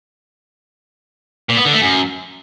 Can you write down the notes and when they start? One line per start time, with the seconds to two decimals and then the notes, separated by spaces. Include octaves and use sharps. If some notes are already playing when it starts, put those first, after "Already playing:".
1.49 A#2
1.57 B3
1.65 D3
1.73 A3
1.82 F#2